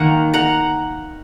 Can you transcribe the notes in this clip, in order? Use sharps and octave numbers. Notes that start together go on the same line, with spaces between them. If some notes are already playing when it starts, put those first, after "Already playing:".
Already playing: D#3 A#3 F#5 A#5
F#5 A#5